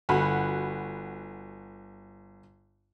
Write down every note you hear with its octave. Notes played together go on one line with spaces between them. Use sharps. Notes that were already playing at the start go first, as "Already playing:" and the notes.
G1 F#4 B5